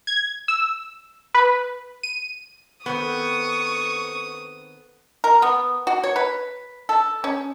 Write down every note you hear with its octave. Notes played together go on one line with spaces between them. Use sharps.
G#6
E6
B4
D#7
D#3 B3 C4 A4 C#6 D#6
A#4
B3
F#4
C#5
B4
A4
C#4